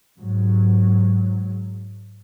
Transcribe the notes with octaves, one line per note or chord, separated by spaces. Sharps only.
G#2 F#3